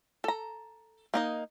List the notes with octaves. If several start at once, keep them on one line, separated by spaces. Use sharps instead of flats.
A4 A#5
A#3 D#4 D#5